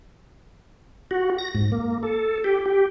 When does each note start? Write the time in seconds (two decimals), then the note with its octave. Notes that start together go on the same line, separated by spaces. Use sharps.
1.11 F#4
1.38 A#6
1.55 G#2
1.72 A#3
2.03 A4
2.44 G4
2.66 G4